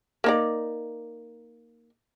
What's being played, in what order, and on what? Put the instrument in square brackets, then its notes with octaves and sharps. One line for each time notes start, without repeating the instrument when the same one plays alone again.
[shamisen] A#3 D#4 D5